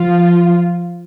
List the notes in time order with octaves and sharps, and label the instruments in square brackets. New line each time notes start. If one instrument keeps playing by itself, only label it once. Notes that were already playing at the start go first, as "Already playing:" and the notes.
Already playing: [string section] F3 F4